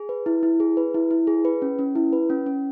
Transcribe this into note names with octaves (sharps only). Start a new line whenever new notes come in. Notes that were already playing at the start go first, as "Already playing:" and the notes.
Already playing: G#4
B4
E4
E4
G#4
B4
E4
E4
G#4
B4
C#4
C#4
E4
B4
C#4
C#4